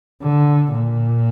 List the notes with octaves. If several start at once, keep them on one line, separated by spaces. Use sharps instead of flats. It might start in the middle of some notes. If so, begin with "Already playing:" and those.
D3
A#2